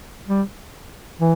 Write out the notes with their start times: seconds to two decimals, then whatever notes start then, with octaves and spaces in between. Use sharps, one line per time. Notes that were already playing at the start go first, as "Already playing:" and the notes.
0.28 G3
1.20 E3